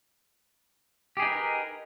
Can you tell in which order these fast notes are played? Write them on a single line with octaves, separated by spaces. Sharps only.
G4 G#4 D#4 B4 A#4